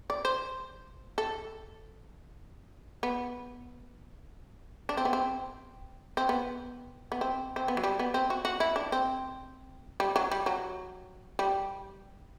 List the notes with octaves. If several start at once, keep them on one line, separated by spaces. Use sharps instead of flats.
D5
C5
A4
B3
D4
C4
B3
C4
C4
B3
B3
C4
C4
B3
F#3
G3
B3
C4
F#4
F#4
E4
D4
C4
G3
F#3
G3
F#3
G3